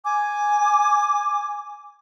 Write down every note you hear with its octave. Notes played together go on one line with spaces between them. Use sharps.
G#5 D6